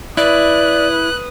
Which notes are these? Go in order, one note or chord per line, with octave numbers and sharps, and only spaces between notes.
E4 B4 D5 D#6 F#6